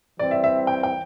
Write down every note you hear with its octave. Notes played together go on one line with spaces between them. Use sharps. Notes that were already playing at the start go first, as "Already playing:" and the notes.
E3 G3 C4 D5
E5
E5
G5
G5